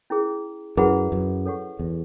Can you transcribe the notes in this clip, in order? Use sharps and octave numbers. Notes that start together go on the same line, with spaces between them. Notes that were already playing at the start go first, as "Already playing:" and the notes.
C#4 E4 G#4
F#2 E4 G#4 B4 F#5 B5
F#2
A4 C#5 F#5 C#6
E2